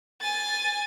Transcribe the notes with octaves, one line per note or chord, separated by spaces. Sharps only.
G#5 A6